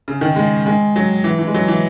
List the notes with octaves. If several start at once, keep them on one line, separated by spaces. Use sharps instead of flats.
C#3
D#3
G#3
G#3
F#3
E3
E3
G#3
F#3
E3